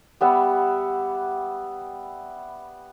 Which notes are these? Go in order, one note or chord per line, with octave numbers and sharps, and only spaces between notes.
G3 B3 E5 F#5